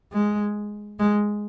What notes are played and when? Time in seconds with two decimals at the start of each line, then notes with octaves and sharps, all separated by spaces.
0.12 G#3
0.99 G#3